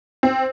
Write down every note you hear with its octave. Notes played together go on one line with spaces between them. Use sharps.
C4